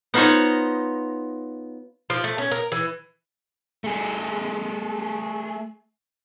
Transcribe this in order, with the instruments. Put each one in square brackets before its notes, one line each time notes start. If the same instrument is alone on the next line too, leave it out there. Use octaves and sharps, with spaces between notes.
[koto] B3 D#4 F4 C5 C#5 D#5
[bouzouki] F3
A3
C#4
A#4
E3
[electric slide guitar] A3 G#4